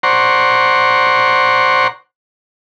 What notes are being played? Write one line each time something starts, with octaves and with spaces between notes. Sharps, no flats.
C5 D5 F#5 A#5 C6 C#6